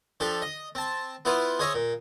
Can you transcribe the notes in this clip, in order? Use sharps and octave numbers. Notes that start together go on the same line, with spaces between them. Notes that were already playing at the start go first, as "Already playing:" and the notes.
F3 D4 G4 A4
D#5
C4 A5
B3 E4 F4 B4 C5
G#4 C5 C#5 D#5 E5
A#2